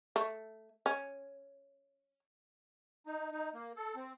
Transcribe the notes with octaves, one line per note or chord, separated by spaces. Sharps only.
A3
C#4
D#4
D#4
A#3
A4
C4